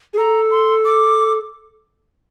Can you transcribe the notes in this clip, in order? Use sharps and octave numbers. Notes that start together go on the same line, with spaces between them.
G#4
A4 A#5
C6
D6